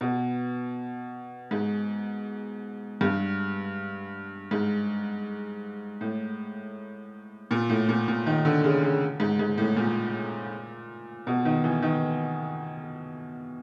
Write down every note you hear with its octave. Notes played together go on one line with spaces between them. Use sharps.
B2
G#2
G2
G#2
A2
A#2
A2
A#2
A#2
D#3
D3
C#3
C#3
G#2
G#2
A2
A#2
B2
D#3
E3
D#3